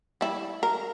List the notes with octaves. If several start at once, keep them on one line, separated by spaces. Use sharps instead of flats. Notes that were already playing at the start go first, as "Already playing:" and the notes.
G3 E4
A#4